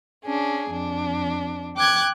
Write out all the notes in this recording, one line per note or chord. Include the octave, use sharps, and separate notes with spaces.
C#4 D4 G#4
F2 D4
G5 D6 F#6 G#6